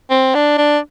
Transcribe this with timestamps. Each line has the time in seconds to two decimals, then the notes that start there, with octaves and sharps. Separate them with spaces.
0.10 C4
0.35 D4
0.58 D4